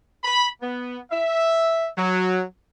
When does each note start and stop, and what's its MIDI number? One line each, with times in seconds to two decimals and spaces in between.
0.24 0.46 83
0.61 0.98 59
1.12 1.86 76
1.97 2.41 54